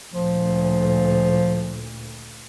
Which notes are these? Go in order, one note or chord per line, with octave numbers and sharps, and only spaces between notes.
D2 A#2 F3